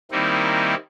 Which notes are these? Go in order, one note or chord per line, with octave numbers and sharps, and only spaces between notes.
D#3 G3 A#3 C4 D#4 E4